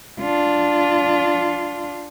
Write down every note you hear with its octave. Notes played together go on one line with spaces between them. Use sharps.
D4 F4